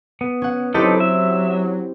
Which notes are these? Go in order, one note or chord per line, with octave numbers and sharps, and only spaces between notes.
B3
C#4 F#5
F#3 C4 D#4 E4 G4 A4 B4
E5